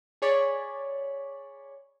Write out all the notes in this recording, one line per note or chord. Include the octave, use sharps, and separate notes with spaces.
G#4 C#5 D5 B5